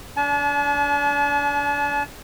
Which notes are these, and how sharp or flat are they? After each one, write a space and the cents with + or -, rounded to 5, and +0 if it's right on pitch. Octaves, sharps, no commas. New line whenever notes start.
D4 -30 A5 -45